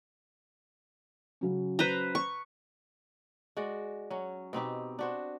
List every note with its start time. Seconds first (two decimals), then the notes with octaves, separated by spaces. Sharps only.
1.41 C#3 F#3 C#4
1.79 B4 C5 A#5
2.15 C#6
3.57 G#3 F#4 D5
4.10 F#3 C#4
4.53 B2 C4 D#4 G4
4.99 D4 F#4 C5